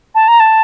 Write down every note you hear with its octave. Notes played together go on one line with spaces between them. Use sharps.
A5
A#5
A5